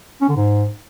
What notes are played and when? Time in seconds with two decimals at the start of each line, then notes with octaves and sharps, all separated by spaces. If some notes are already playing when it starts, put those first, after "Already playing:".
0.21 C#4
0.29 D3
0.36 G#2